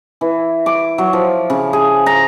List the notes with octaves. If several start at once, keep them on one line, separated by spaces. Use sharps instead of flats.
E3
D6
F#3
F3
C#3
G#4
A#5